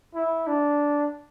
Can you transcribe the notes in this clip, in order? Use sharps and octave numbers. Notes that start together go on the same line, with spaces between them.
E4
D4